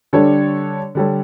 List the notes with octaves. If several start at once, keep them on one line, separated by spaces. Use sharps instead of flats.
D3 G3 D4 A4 C#5
D3 G3 D4 A4 C#5